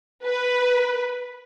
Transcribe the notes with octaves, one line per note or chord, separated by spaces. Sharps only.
B4